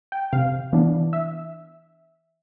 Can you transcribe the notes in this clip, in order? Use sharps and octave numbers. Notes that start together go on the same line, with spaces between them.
G5
C3 F5
E3 B3 D4
E5